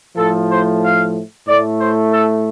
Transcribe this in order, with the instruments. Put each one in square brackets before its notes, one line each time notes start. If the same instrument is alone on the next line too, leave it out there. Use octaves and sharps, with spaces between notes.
[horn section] A2 F3 A3 A4
C5
F5
A2 A3 D5
C5
A4